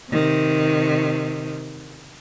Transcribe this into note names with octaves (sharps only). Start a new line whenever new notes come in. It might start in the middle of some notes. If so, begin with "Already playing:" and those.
C3 D#3